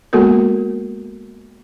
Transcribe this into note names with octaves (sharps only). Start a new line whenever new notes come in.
G#3 A#3 B3 F#4 A4 A#4